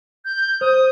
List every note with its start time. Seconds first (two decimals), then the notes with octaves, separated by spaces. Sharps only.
0.25 G6
0.61 C5 D#6